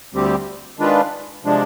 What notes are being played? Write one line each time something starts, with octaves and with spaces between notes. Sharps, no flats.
D2 D3 G3 C4 G4
D#3 G#3 D4 F4 B4
C3 F3 G#3 D4